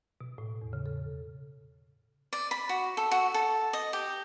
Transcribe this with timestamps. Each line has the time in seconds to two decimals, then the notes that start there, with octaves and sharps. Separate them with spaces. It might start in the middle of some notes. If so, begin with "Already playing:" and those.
0.21 B2
0.38 A2
0.62 E2
0.73 C#3
0.86 A4
2.33 D5
2.51 B5
2.69 F#4
2.97 A4
3.11 F#4
3.34 A4
3.73 D#5
3.93 G4